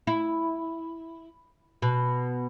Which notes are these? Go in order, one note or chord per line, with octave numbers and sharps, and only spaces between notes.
E4
B2